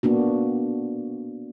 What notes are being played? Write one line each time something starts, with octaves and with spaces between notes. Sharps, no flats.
A#3 B3 D4 F#4